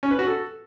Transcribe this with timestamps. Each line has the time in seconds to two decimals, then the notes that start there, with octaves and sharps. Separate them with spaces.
0.03 C#4
0.11 B4
0.19 F#4
0.27 A4